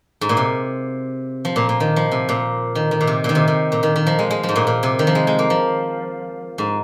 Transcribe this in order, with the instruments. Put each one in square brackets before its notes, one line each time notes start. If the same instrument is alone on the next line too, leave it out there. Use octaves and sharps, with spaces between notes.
[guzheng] G#2
A#2
C3
F3
A#2
A#2
D#3
F3
C3
A#2
D#3
D#3
A#2
C3
A#2 D#3
C3
C3
A#2
D#3
D#3
F3
G#3
G#3
F3
G#2
A#2
A#2
C3
D#3
F3
G#3
G#3
A#3
F3
G#2